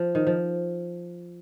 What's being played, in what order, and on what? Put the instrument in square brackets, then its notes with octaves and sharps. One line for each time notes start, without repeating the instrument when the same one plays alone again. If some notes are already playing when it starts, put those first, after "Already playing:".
Already playing: [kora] F3
D#3
F3